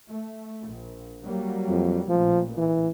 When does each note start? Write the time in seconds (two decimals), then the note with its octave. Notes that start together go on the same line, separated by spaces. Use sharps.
0.11 A3
0.68 A#1
1.23 F#3 G3 A#3
1.69 F2
2.09 A1 A#2 F3
2.58 E3